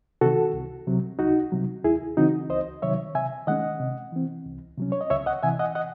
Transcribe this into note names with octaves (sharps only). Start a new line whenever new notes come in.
C3 D#3 F#4 A4
C2
C3 F#3
C2 D#4 F#4
C3 F#3
D#2 E4 G#4
C#3 E3 C4 D#4 F#4
C#2 C5 D#5
C3 D#3 F#3 C#5 E5
C3 E5 G#5
D#3 G#3 C#4 D#5 F#5
C3
E3 C4
C2
C3 F#3 C#4
C#5
D#5
C#2 C#5 E5
D#5 F#5
C3 E3 E5 G#5
D#5 F#5
D#5 F#5